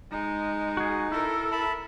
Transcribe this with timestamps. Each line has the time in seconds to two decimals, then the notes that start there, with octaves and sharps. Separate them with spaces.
0.12 G#3 D#4
0.77 F#4 G#4
1.12 E4 A4 A#4
1.52 E5 A5 B5